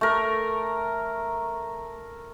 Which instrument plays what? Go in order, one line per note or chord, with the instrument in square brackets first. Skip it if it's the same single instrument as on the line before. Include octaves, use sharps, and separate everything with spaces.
[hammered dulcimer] A3 A#4